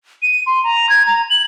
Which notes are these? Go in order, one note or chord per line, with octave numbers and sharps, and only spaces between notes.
D#7
C6
A#5
G#6
A#5
F#7